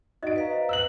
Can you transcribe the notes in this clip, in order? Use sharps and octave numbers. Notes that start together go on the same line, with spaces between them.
D#4 F#4 D5 D#5 D7
B4 F5 A#5
C5 D#5
E6 F#6 F#7